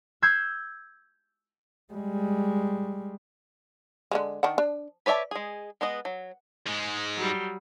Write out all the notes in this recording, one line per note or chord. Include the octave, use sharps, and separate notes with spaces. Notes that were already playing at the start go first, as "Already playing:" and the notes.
E6 G6 G#6 C7
G3 G#3
D3 G3 G#3
D#3 D4 F#5
D4
B4 C#5 D5 E5 A5
G#3 G#4
G#3 B3 B4 D#5
F#3
G#2 G#3
F#3 G3